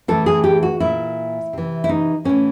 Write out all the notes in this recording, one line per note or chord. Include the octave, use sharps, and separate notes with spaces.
A2 E3 A4
G#4
G4
F#4
A#2 E4
C3 E3
E4
D#4
A2 E3 C#4